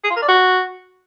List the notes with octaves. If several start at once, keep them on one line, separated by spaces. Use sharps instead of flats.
G#4
F4
A#4
D5
F#4